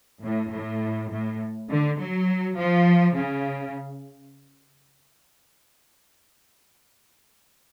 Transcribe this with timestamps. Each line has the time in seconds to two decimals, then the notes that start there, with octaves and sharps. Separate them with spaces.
0.24 A2
0.52 A2
1.11 A2
1.69 D3
1.99 F#3
2.58 F3
3.17 C#3